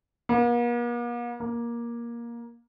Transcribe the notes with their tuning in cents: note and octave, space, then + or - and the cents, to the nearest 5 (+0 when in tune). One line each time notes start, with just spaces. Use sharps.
A#3 +45
A#3 +15